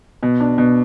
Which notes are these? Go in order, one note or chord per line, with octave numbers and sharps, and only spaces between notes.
B2
D4
B2